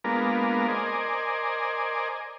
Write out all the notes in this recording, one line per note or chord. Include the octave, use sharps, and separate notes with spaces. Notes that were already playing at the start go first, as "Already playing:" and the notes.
G#3 A#3 B3 D4 F4 A#4
A#4 C5 D5 D#5 G#5